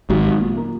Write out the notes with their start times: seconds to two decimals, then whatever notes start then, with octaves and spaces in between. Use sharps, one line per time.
0.10 G#1 G#2 F#3
0.26 F#3
0.40 A#2
0.57 A#3